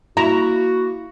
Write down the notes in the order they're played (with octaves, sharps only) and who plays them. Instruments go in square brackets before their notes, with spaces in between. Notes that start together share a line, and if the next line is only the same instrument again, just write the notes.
[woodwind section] A#3 F#4 [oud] E4 [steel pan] A#5